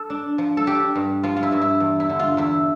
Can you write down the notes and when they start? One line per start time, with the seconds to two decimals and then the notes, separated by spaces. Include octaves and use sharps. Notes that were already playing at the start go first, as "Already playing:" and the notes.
Already playing: A4
0.10 D4
0.38 F3
0.57 A4
0.66 D4 G4
0.96 G2
1.23 F3 F4
1.37 F4
1.43 E4
1.52 G2
1.61 E4
1.80 E2
2.00 E4
2.09 D3
2.19 F4
2.37 E2 E4